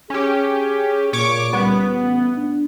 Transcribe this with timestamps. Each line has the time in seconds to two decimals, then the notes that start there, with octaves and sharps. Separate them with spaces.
0.10 C#4 G4 G#4
1.13 A#2 C#5 C#6 D6
1.53 C#2 G3 B3
2.01 A1
2.35 D4